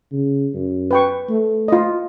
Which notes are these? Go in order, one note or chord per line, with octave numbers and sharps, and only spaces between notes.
C#3
F#2
B4 G5 C#6
A3
F4 D#5